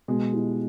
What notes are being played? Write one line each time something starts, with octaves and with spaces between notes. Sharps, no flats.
B2 G#3
G3 B3 E4